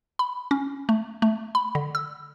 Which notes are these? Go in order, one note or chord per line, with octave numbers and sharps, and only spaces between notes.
B5
C#4
A3
A3
B5
D3
E6